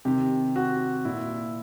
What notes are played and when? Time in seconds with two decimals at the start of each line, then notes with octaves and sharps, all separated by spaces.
0.05 C3 D#3 G4
0.56 F#4
1.05 A#2 E4